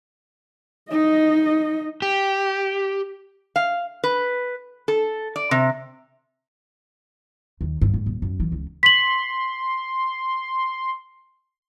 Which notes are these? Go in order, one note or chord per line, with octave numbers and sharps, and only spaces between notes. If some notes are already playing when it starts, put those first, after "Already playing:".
D#4 D#5
G4
F5
B4
A4
D5
C3
D#2
G2
G#2
D#1
F#2
E3
C#2
C6 B6 F#7